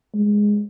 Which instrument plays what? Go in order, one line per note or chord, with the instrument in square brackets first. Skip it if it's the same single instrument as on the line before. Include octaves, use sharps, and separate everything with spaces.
[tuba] G#3